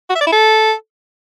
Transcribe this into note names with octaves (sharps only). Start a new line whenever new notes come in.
F#4
E5
D5
E4
A4